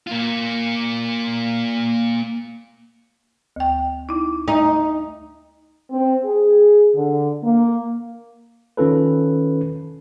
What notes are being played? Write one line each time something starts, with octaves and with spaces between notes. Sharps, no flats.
A#3 F4
D2 G5
D#4 E4
A3 D#4 A#5
C4
G#4
D3
A#3
D#3 C#4 F4 A4 B4